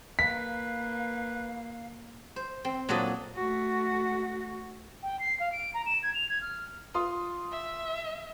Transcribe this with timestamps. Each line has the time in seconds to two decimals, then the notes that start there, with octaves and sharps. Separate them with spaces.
0.19 A#3 B4 F5 B6
2.36 C5
2.65 C4
2.89 A#2 F#3 A#3 D4 A4 D#5
3.35 A3 F#4
5.03 G5
5.20 C7
5.40 F5
5.52 D7
5.74 A#5
5.86 E7
6.03 G#6
6.14 F7
6.29 G#6
6.42 F6
6.94 F4 C6 D#6
7.52 E5